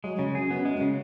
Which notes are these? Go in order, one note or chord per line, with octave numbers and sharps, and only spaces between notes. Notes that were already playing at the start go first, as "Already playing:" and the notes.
F#3 G#3
C#3 F#3
F#2 G#4
F#2 B3
F#2 G#3
F#2
C#3